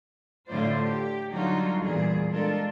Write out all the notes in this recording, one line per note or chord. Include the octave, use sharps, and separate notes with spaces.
A2 D3 A3 F4 C5 D5
G4
D3 F#3 G3 D#4 F4 F#4
E2 A#2 G3 G#4
G#3 D4 F4 A4 A#4